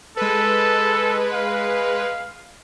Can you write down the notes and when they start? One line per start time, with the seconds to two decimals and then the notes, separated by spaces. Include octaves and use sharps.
0.17 G#3 A4 B4
1.33 F5